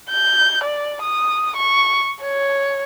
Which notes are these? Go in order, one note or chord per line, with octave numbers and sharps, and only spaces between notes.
G6
D5
D#6
C#6
C#5